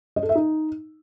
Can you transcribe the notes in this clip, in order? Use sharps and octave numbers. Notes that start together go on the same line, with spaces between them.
D#5
A4
E5
D#4